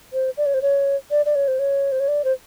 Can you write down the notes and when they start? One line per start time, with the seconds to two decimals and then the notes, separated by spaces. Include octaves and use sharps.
0.13 C5
0.37 D5
0.46 C#5
0.54 C5
0.62 C#5
1.11 D5
1.26 D5
1.35 C#5
1.48 C5
1.59 C#5
1.92 C5
2.00 C#5
2.08 D5
2.24 C5